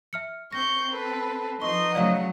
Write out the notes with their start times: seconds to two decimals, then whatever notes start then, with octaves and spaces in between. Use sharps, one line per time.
0.13 E5 F6 C#7
0.53 C4 C#6 G6 A#6
0.92 A4 B4
1.62 F3 D#4 B4 D#5 C6 C#6 C7
1.95 C#3 F#3 A3 D5 F5 F#5 A#5